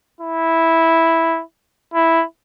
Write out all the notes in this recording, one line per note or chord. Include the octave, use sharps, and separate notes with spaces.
E4
E4